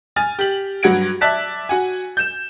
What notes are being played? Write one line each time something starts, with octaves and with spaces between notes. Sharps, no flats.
G#5 F6 A6
G4 F#7
G2 F#3 F#5 G#6 D7
D5 E5 A5 F#6 B6
F#4 F#5 G#5
G6 E7